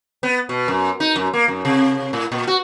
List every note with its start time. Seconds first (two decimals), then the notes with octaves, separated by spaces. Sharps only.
0.23 B3
0.49 B2
0.68 F#2
1.00 D#4
1.16 F#2
1.33 A#3
1.48 F#2
1.65 C3
2.13 A2
2.32 A#2
2.47 F#4